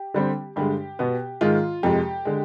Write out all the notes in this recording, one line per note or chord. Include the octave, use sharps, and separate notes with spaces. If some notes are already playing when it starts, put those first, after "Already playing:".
Already playing: G4
D3 G3 C4
G2 D3 G#3 G4
B2 B3
G#2 D#3 G#3 F4
F2 C3 F3 G#3 G4
D3 G#3